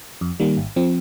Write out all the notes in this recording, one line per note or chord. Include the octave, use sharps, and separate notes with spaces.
F2
D#3 G3 A#3
G#1
F3 C4